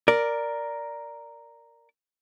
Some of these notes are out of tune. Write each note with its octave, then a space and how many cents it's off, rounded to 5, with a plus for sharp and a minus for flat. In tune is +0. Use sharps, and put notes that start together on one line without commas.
A#4 +0 D5 +0